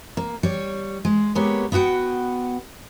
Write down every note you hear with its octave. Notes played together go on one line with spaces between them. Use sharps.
A#3
G3 C#5
G#3
G#3 A#3 B3 G4 C#5
B3 E4 F#4 F#5 G5